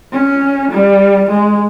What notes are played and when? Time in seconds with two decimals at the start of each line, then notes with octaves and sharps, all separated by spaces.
0.12 C#4
0.72 G3
1.29 G#3